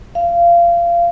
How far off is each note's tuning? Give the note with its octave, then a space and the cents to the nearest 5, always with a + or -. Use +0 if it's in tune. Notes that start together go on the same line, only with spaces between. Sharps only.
F5 -25